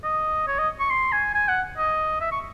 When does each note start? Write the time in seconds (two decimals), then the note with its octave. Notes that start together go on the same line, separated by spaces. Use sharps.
0.04 D#5
0.47 C#5
0.58 D#5
0.80 C#6
0.90 C6
1.12 G#5
1.34 G#5
1.49 F#5
1.77 D#5
2.21 E5
2.32 C#6